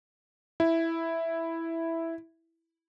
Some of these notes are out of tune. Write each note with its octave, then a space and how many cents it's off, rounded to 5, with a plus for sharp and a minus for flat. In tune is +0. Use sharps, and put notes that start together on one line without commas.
E4 +0